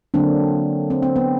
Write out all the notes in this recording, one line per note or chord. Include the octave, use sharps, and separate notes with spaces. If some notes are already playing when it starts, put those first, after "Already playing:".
D3 F#3 A#3 C4 D4
C4
C4
B3